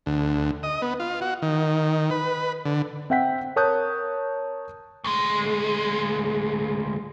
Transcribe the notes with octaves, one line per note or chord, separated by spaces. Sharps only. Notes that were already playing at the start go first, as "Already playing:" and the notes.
D2
D#5
B3
F4
F#4
D#3
B4
D3
C4 E5 F#5 G5 B6
A#4 C#5 A5 D#6 F#6 G6
D2 G#3